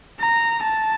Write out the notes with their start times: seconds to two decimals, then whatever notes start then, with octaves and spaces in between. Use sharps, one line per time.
0.20 A#5
0.63 A5